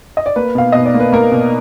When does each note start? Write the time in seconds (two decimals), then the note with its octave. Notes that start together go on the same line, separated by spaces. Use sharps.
0.17 D#5
0.26 D5
0.36 A#3 B4
0.55 B2 F5
0.72 B2 D#5
0.86 D5
0.94 A#3
1.00 B4
1.13 A#3 A#4
1.32 B2